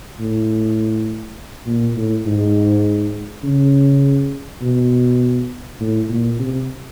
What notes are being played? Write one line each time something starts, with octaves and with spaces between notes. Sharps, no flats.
A2
A#2
A2
G#2
C#3
B2
A2
A#2
C3